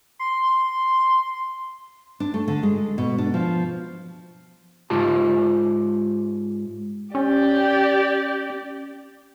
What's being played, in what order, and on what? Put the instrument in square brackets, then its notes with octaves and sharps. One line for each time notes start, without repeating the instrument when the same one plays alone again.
[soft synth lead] C6
[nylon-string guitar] D4
A3
D3
G#3
B2
D4
F3
[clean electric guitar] G#2 F4 G4 A5
[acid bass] C#4 [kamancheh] G4 D5